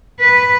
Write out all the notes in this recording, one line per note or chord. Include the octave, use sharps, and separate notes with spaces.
B4